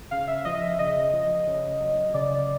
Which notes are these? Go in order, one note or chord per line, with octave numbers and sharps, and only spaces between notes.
C#3 F5
E5
F3 D#5
E5
C#3 D#5
F3
C#3
F#3
C#3 D5